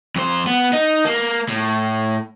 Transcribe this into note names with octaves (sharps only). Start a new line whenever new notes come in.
F2 C5
B3
D#4
A#3
A2